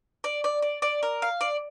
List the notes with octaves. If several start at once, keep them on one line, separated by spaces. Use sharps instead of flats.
D5
D5
D5
D5
A#4
F5
D5